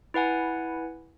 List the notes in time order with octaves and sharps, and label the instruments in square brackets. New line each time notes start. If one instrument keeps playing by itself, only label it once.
[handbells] E4 B4 F#5 G#5